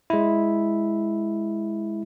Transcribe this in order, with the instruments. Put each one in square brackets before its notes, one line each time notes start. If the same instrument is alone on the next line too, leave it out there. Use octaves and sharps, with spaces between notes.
[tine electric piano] G#3 E4